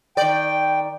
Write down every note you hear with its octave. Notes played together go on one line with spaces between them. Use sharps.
D#3 D5 G5